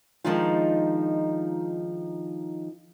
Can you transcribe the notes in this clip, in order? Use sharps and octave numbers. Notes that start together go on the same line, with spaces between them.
D#3 F3 G#3 D4 D#4 F4